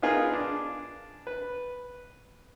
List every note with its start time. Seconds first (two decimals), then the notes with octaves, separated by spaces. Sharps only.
0.02 B3 D#4 F4 G#4 A#4
0.34 D4
1.27 B4